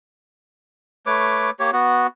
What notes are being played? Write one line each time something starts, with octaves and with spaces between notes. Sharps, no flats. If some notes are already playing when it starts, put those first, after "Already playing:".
A3 B4 C#5 D6
A#3 G4 C#5
B3 F#4